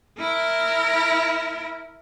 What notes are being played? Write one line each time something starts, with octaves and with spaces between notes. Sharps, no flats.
E4 A#4